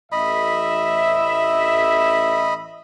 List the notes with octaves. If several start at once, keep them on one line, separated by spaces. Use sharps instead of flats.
A1 D#5 E5 B5